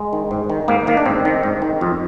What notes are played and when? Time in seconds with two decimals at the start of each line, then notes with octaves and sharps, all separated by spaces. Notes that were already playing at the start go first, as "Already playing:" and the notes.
Already playing: G#3
0.13 D#3
0.31 G#2
0.50 D#3
0.68 G#2 A#3
0.87 D#3 A#3
0.97 D4
1.06 G#2 C4
1.25 D#3
1.43 G#2
1.62 D#3
1.81 F2